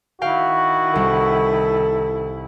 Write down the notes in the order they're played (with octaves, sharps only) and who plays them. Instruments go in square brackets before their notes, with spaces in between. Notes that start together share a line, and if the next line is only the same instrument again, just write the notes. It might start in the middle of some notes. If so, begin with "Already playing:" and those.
[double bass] D#3 E4 [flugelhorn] F#4 [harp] F5 G5
[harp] C2 [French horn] A4